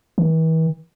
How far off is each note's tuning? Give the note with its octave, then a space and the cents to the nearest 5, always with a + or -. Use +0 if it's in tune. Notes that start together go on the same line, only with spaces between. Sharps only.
E3 -40